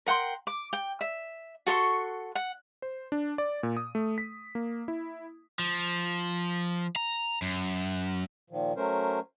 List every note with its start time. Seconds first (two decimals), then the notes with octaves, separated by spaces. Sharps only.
0.06 A#4 F#5 G5 C6
0.47 D6
0.73 G5
1.01 E5
1.67 F#4 A4 C6 C#6
2.35 F#5
2.82 C5
3.12 D4
3.38 D5
3.63 A#2
3.77 D#6
3.95 A3
4.18 B6
4.55 A#3
4.88 E4
5.59 F3
6.96 A#5
7.42 F#2
8.50 A#2 D#3 F3
8.77 F#3 A3 C#4 A#4 C5